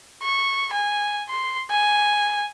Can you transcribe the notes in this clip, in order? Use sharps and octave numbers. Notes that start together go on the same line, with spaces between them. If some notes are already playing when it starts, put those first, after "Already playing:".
C#6
G#5
C6
G#5